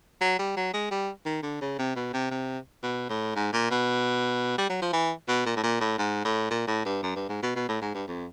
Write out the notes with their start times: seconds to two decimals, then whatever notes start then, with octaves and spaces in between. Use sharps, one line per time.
0.21 F#3
0.39 G3
0.56 F#3
0.74 G#3
0.91 G3
1.26 D#3
1.43 D3
1.61 C#3
1.78 C3
1.96 B2
2.13 C3
2.31 C3
2.83 B2
3.09 A2
3.35 G#2
3.53 A#2
3.71 B2
4.58 G3
4.70 F#3
4.82 F3
4.93 E3
5.28 B2
5.46 A#2
5.56 A2
5.63 A#2
5.80 A2
5.98 G#2
6.25 A2
6.50 A#2
6.67 A2
6.85 G2
7.03 F#2
7.16 G2
7.29 G#2
7.43 B2
7.55 B2
7.69 A2
7.81 G#2
7.94 G2
8.08 F2